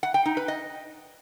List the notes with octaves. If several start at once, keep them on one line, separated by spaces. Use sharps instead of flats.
F#5
G5
D#4
B4
D#5